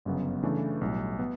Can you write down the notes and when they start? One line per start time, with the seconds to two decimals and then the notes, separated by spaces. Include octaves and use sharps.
0.05 G1 F#2 C#3 F#3 B3
0.43 C#3 E3 A3 D4 A4
0.81 B1 A2 G3
1.19 B3